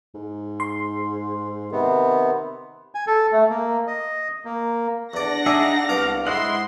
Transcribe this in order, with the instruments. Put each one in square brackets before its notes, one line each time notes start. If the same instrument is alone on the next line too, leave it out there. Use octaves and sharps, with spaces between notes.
[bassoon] G#2
[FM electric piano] C6
[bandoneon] C3 B3 [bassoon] D#3
[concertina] G#5
A4
A3
A#3
D#5
A#3
[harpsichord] E2 D5 [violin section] D4 F#5 A#6
[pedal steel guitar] D#4 G#4 E5 [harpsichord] D5
[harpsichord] C2 B3 D6 [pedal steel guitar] F5
[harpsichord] G#2 [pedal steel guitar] E4 D#5 F#5 [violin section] C6